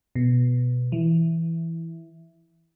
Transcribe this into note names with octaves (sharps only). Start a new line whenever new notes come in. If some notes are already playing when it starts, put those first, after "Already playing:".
B2
E3